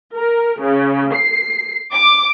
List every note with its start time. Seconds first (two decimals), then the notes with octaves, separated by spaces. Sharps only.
0.16 A#4
0.62 C#3
1.14 C7
1.94 D6